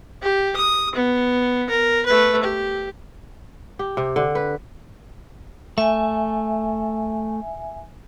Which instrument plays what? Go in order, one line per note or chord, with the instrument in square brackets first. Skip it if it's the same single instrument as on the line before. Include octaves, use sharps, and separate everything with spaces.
[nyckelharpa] G4
D#6
B3
A#4
A3 B4
G4
[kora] G4
C3
D3
B4
[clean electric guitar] A3 [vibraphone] E5 G#5